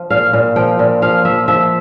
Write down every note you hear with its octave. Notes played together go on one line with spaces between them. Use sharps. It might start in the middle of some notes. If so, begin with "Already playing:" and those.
Already playing: F3
A#2 F5
A#2
F3 G5
A#2
F3 F5
F3 E5
F3 E5